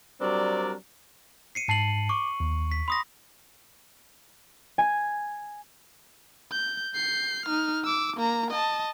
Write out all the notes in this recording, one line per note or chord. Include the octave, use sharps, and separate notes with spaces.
F#3 G3 C4 D4 A#4 D5
C7 C#7 D#7
G#2 A5 C7 D#7 F#7
C#6 D6
D#2
B6
B5 C6 D#6 A#6
G#5
G6
G6 C7
D#4 F6
D6 E6
A#3 A#5
D#5 A5